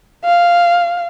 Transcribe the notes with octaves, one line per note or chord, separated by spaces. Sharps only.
F5